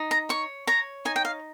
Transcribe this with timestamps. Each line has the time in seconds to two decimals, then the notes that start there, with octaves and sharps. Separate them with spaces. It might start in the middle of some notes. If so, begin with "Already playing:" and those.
Already playing: D#4
0.11 A#5
0.29 C#5 C#6
0.67 C#5 A#5
1.05 D#4 G#5
1.16 G5
1.25 F5